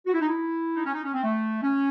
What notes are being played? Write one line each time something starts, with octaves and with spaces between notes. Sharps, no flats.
F#4
E4
D#4
E4
D#4
C#4
D#4
C#4
C4
A3
C#4